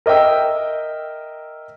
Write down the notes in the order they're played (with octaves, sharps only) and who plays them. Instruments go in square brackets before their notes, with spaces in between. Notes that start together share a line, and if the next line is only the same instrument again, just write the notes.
[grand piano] A#4 D#5 E5 G5 E6